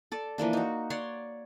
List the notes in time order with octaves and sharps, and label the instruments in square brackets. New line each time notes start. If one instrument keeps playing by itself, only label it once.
[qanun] A4 D5
E3 F3 A#3 D4
D#4 F#4
C#5 D5 F#5 C6